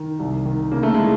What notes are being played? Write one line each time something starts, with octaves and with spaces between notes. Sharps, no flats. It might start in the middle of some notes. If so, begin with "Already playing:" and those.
Already playing: D#3
C2
D#3
C#3 A#3
A3
E3 G#3